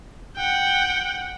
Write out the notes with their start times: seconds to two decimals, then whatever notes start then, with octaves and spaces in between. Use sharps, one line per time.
0.37 F#5 G5